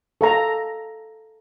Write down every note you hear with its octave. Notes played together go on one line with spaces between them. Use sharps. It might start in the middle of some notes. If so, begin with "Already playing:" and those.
A4 F5 A#5